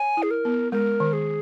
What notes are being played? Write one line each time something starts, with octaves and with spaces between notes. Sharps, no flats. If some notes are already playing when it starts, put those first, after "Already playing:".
Already playing: C#5 G#5
E4
G#4
A#4
B3
G#3 A#4
D#3
G#4